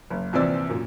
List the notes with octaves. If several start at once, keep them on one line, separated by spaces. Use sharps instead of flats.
F#1
A#1 C3 E3 C5 D5 E6
F#2 A#2